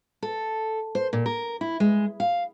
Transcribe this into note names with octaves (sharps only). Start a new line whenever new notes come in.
A4
C5
A#2
A#4
E4
G#3
F5